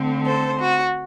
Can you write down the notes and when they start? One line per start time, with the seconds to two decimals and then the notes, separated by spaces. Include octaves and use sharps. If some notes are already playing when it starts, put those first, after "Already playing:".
Already playing: D3 A3 C4
0.26 A4 C5
0.60 F#4